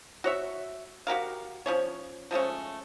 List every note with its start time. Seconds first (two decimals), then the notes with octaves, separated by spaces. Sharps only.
0.24 F#4 C#5 E5
1.07 F#4 G4 A#4 F5
1.66 F3 C#4 C#5
2.31 F3 G#3 A3 C#4